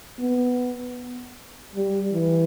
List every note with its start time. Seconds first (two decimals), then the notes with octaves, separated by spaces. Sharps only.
0.19 B3
1.75 G3
2.13 E3